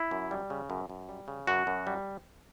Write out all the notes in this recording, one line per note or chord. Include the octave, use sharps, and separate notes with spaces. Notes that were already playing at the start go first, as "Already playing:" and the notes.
Already playing: E4
F#2
G3
C#3
F#2
F#2
G3
C#3
F#2 F#4
F#2
G3